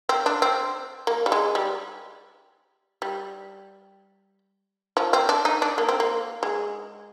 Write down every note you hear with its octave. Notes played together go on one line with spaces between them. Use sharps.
C4
D4
C4
A#3
G3
G#3
G3
G3
F3
C4
D4
D#4
D4
A#3
C4
A#3
G#3